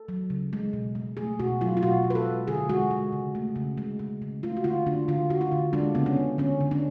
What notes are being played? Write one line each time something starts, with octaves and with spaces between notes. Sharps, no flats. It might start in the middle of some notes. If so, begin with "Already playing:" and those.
Already playing: A4
F#3
C#3
G#3
B2
G#3
A3 G#4
B2 F#4
F#3 F4
F4
B2 F#4
B2
B4
A4
G#3
D3 G#4
G#3 F#4
G#3
C#3
A3
C#3
G#3
G#3
C#3
A3 F4
F#4
D3 F4
D3 D4
D3 F4
D3 F#4
F4
D3
G#3 D4
C#3 B3
C#4
C#3
D3 C#4
D3
D4